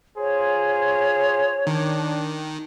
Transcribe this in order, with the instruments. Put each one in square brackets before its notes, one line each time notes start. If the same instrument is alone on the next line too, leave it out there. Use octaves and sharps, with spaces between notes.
[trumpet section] F4 G#4 C5 [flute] C#5
[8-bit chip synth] D#3 [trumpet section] D4